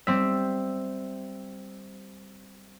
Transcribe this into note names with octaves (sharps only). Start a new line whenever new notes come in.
G3 C4 E5